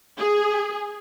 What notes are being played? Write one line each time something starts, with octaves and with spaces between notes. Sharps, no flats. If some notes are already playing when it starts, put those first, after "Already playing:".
G#4